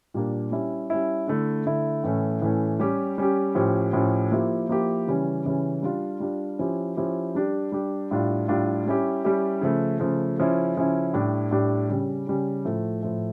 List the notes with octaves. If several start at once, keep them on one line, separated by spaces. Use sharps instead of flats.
A#2 G3 A#3 D4
G3 C#4 E4
G3 C#4 E4
D3 A3 E4
D3 A3 E4
A2 E3 A3 C#4
A2 E3 A3 C#4
G3 C#4 G4
G3 C#4 G4
A2 F3 C#4 G4
A2 F3 C#4 G4
F3 A#3 E4 G4
F3 A#3 E4 G4
C#3 E3 G3 C#4
C#3 E3 G3 C#4
G3 D4 F4
G3 D4 F4
F3 C#4 E4 G4
F3 C#4 E4 G4
G3 D4 G4
G3 D4 G4
A2 G3 D4 F4
A2 G3 D4 F4
G3 C#4 E4 G4
G3 C#4 E4 G4
C#3 F3 A3
C#3 F3 A3
C#3 F3 C#4 E4
C#3 F3 C#4 E4
A2 G3 D4 G4
A2 G3 D4 G4
C#3 G3 C#4
C#3 G3 C#4
A2 F3 A3
A2 F3 A3